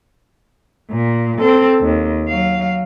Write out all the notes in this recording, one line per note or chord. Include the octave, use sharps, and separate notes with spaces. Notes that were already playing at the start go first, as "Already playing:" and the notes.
A#2
C4 A4
D#2
F#3 F5